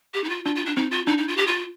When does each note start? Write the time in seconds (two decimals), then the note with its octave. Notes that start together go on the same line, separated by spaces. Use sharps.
0.14 G4
0.24 D#4
0.29 F4
0.45 D4 F4
0.55 F4
0.66 D4
0.76 C4 D#4
0.91 F4
1.07 D4 D#4
1.18 D#4
1.28 F4
1.37 G4
1.47 F4